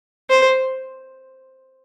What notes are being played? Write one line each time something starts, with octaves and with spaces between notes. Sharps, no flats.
C5